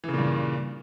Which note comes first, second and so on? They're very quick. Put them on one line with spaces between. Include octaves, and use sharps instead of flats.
E3 C#3 A#2 G2